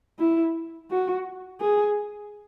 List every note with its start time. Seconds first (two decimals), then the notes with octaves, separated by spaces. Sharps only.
0.19 E4
0.90 F#4
1.61 G#4